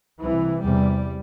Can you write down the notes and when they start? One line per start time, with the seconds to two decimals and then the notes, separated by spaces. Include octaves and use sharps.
0.21 C2 C3 E3
0.64 E2 C3 G3